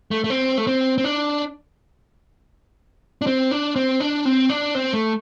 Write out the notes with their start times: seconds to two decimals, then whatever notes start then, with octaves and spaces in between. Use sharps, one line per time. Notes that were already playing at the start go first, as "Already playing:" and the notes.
0.11 A3
0.24 A3
0.30 C4
0.58 A3
0.67 C4
0.98 C4
1.04 D4
3.22 D4
3.27 C4
3.51 D4
3.76 C4
4.00 D4
4.25 C4
4.49 D4
4.75 C4
4.93 A3